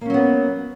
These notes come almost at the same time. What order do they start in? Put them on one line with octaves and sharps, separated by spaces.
A#3 C#4 F#3 B3